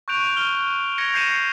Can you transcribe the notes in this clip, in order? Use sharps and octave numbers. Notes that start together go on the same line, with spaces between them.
C#6 F#6 G6 D7 F7
F6 G7
G#6 A#6 C#7 F7 G7
G6 A#6 C7 C#7 D#7 E7